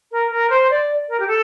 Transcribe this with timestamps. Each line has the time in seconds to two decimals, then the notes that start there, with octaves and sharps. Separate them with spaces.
0.11 A#4
0.30 A#4
0.49 C5
0.70 D5
1.08 A#4
1.19 G4
1.27 A4